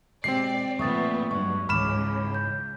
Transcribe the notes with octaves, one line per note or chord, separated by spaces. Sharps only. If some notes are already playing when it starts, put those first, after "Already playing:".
B2 G#3 C4 G4 D5 C7
A#2 F3 A3 B3 C#6 D#6 A6
G2 F#3 G#3 F#5 C#6
C#2 G#2 C#3 E3 B5 D6 F6 E7
G6